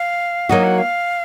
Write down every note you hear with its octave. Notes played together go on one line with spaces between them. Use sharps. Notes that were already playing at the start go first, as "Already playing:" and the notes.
Already playing: F5
F#3 A#3 D#4 F#4 D#5
F#5
F5